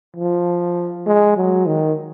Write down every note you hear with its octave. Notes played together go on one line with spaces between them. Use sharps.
F3
G#3
F#3
D#3